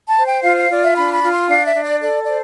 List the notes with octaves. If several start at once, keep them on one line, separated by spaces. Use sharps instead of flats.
A5
C5
G5
F4 F5
F5
F4 D5
E5
D4 B5
B5
F4
C6
D4 F5
E5
D4
D5
A4 D5
C5 D5